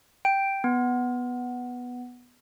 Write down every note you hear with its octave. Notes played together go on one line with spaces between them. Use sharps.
G5
B3